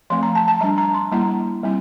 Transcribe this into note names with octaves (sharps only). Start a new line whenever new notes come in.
F3 A3 C4 C6
A#5
A5
A5
G3 D4 A#5
A#5
C6
G3 A#3 E4 A#5
G3 C4 E4